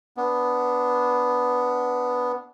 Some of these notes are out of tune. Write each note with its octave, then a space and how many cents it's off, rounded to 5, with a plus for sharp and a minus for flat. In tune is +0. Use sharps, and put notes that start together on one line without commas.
B3 +0 D4 -10